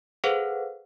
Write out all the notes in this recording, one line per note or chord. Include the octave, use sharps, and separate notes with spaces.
G#4 A4 B4 C5 F5 F#5